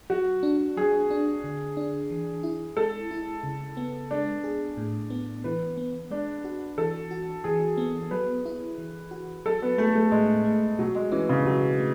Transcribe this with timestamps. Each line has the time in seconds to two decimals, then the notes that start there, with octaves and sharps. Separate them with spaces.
0.10 F#3 F#4
0.43 D4
0.77 F#3 G#4
1.10 D4
1.44 D3
1.77 D4
2.10 E3
2.43 E4
2.77 G#3 A4
3.11 E4
3.43 C#3
3.77 B3
4.11 G#3 D4
4.44 G#4
4.77 A2
5.10 B3
5.44 E3 B4
5.77 B3
6.11 G#3 D4
6.44 F#4
6.78 E3 A4
7.11 F#4
7.44 E3 G#4
7.78 B3
8.11 F#3 B4
8.46 E4
8.78 E3
9.11 F#4
9.46 F#3 A4
9.62 B3
9.78 A3 G#4
9.95 A3
10.12 A2 G#3
10.45 A3
10.79 B2 F#3
10.95 G#3
11.12 E3 C#4
11.29 C#3
11.46 B2 F#3
11.79 A3